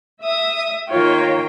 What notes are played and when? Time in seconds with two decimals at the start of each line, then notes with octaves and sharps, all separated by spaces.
0.24 E5 D#6
0.89 D#3 A#3 F4 C#5 G5